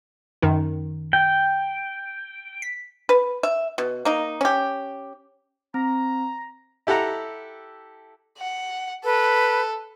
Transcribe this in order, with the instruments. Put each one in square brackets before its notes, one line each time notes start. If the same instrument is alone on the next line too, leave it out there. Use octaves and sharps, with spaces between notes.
[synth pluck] F#2 D#3 D#4
[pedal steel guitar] G5
[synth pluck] B6
[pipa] B4
E5
B2
A#3 D#4
C#4 G4
[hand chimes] C4 [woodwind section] A#5
[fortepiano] E4 G4 A4 F#5 A#5
[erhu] F#5
[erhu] A4 [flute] B4